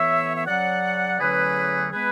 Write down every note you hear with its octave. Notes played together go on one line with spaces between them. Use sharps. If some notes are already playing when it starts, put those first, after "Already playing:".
Already playing: A2 E3 B3 C#5 E5
E5
C#3 F#3 C#4 D5 F#5
E2 D3 F#3 A3 C#4 G#4 B4
G#3 B3 G#4 B4